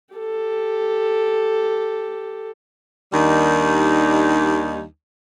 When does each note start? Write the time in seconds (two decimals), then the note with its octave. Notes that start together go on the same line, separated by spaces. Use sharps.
0.15 G4 A4
3.13 D#2 D#3 G3 D4 D#4